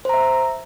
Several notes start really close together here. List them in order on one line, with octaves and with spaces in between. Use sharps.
C5 A#5 E5